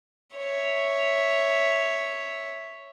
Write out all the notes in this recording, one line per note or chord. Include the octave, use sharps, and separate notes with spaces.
C#5 E5